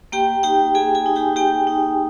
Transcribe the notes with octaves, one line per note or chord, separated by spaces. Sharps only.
A#3 G4 G5
D#4 G4 G5
A#3 G#4 G#5
G#4 G#5
D#4
G4 G5
A#3 G4 G5
D#4